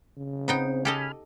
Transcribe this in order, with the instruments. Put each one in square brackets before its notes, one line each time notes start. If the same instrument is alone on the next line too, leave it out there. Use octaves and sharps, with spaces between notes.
[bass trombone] C#3
[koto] B3 D#4 G5 [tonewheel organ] C4
[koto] G4 A4 D#5 [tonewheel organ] G#5 B5 F6